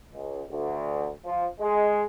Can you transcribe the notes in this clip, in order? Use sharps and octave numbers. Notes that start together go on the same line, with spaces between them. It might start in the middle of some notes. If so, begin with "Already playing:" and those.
C#2
D2
F3
G#3